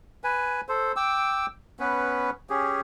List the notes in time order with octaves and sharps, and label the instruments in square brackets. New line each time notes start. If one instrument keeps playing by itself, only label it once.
[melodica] B4 G#5
A4 C5
G5 D6 E6
B3 C#4 B4
C#4 G4 G#4